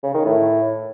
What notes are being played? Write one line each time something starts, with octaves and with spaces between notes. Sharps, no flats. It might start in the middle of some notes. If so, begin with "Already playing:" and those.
C#3
D#3
A2